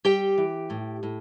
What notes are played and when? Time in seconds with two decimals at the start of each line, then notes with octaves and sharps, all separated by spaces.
0.05 G3 G4 G5
0.38 E3
0.70 A2
1.03 A2